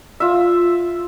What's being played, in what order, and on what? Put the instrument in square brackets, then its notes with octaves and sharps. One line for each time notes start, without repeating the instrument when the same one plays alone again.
[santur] F4 E5